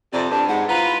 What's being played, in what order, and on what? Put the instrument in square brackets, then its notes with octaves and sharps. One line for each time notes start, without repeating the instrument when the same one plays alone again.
[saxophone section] F2 C3 [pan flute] D5
[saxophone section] G2 [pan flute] A5
[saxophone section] G#2 [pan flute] F#5
[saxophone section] E4 F4 B4 [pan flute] A#5